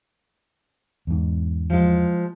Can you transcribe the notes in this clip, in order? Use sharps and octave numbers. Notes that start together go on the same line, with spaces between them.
E2 G#2
F3 G#3